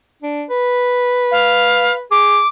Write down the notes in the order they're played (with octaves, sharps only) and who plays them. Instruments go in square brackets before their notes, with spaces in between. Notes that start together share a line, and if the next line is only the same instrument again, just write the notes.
[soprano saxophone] D4
B4
[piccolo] F5
[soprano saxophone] G#4 [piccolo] D6